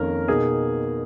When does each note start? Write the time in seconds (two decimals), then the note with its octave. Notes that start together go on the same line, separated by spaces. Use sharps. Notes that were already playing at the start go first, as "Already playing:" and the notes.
Already playing: F2 D#3 A#3 C#4 A#4
0.28 B2 A#3 D#4 G#4